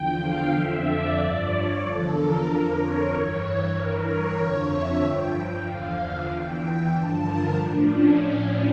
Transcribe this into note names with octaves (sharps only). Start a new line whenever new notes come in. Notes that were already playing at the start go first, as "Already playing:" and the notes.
Already playing: E2 D3 F3 G5
F5
F2 D3 F3 E5
D5
G2 F3
C#5
E2 D3 F3 A4
A#4
F2 D3 F3
C#5
G2 E3 C#5
C#5
G2 E3 A#4
C#5
F2 D3 F3
E5
G2 F3 G5
G5
E2 D3 F3 F5
F5
E2 E3 G5
G2 D3 F3 A5
A#4
A2 F3 D4
C#4